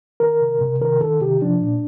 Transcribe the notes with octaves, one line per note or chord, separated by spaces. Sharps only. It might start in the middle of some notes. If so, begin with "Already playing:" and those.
D#3 A#4
C3
C3
D#3 A#4
D#3 A4
C3 G4
F3 D4
A#2